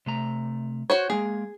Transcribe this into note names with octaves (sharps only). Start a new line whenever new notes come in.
C3 A3 A#5
F#4 C5 C#5
G#3 A#3 G#4